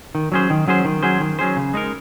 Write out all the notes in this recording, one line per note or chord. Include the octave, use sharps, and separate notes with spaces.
D#3
F#3 C#4 G#4 C5
D#3
F#3 C#4 G#4 C5
D#3
F#3 C#4 G#4 C5
D#3
F#3 C#4 G#4 C5
C#3
G#3 D#4 A#4